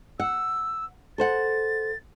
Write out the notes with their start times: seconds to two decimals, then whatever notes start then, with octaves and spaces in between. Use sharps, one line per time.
0.20 F#5 E6
1.18 A4 C5 F#5 A6